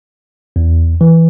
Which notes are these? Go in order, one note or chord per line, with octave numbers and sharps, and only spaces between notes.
E2
E3